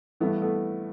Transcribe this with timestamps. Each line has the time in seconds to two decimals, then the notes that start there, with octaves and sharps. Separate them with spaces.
0.20 G2 E3 A3 B3
0.42 A3 B3